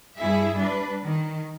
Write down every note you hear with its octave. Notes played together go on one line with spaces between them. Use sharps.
G2 E4 G#4 E5
G3 D4 B4
D#3